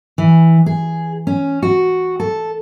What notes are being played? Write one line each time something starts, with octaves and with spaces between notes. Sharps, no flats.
E3
G#4
C#4
F#4
A4